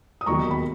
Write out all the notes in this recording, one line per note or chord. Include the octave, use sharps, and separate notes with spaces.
D#6
E1 D#2 D#3 F#3 A#5 C#6
B5